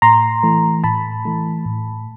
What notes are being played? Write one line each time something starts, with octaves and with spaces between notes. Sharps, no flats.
A2 A#5 C6
E3 A3
A2 A5 B5
E3 A3
A2